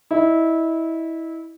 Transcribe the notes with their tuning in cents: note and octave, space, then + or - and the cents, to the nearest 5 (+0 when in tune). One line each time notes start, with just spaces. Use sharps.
E4 -20 D#5 -25